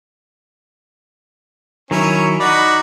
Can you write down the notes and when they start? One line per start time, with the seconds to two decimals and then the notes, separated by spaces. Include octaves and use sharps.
1.91 D#3 F#3 C#4 E4
2.40 D#4 F#4 D5 B5